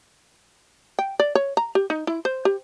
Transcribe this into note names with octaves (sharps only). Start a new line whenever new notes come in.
G5
D5
C#5
A#5
G4
D#4
E4
C5
G4